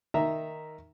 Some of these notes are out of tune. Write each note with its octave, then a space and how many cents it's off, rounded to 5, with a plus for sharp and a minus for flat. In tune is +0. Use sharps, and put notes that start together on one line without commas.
D#3 +0 E5 +0 A#5 +0